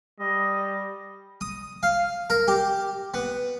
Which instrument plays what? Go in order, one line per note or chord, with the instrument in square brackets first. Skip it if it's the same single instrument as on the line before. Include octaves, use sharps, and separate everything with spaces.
[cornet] G3 [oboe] D#5
[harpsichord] D#6
F5
A#4
G4
B3